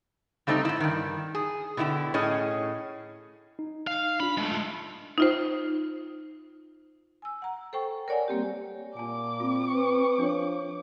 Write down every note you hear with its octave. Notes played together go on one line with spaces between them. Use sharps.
C#3 G3 A3 C4 D#4
G#2 E4
G2 D#3
G#4
B2 D3 E4 F#4 G4
A2 C#4 G#4 D#5
D#4
F5
D4 F4 B5
G#3 A3
D#4 F4 C5
G#5 E6
F#5 A#5
A4 C5 G5 C#6
A#4 C#5 D5 F#5 G#5
G3 A#3 C4 G4
A#2 G#5 A5 D6
C4 F4
B4
F3 D4 A4 C#5